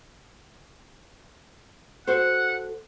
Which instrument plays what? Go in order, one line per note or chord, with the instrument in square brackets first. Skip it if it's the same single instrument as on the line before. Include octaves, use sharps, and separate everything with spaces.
[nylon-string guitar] F#4 A4 C5 [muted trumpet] F#5